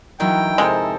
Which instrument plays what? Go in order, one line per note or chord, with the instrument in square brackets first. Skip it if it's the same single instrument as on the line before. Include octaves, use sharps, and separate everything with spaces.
[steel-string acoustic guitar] D2 E3 F#3 [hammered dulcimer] D#3 E4 [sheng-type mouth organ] G5
[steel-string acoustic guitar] F2 A4 A#4 [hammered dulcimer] C3 C5 A5 [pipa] G#3